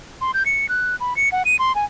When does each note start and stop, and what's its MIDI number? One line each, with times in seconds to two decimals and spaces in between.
0.21 0.31 84
0.34 0.43 91
0.46 0.69 97
0.69 0.96 90
1.00 1.16 83
1.16 1.29 97
1.32 1.43 78
1.45 1.56 99
1.59 1.75 84
1.75 1.85 80